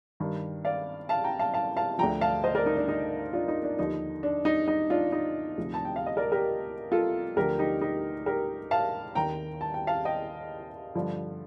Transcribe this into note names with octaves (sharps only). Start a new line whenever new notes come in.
G2 D#3
D5 F5
F5 A5
G5 A#5
F5 A5
F5 A5
F5 A5
D2 D3 F3 G5 A#5
F5 A5
C5 D#5
A#4 D5
D#4
D4
D#4
D4 F4
D#4
D4
D#2 D3 F3 D#4
D4
D#4
D#4
D4 F4
D#4
D2 C3 F3
A5
G5
F5
D#5
A#4 D5
G4 A#4
F4 A4
D2 D3 F3 G4 A#4
D#4 G4
D#4 G4
G4 A#4
F5 A5
D#2 D#3 G5 A#5
A5
G5
F5 A5
D#5 G5
G2 D3 F3